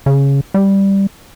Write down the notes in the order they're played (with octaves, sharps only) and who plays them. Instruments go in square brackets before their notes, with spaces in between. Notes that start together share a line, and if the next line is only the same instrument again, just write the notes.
[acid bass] C#3
G3